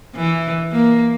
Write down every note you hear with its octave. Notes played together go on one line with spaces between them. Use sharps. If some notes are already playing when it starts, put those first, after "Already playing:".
E3
A#3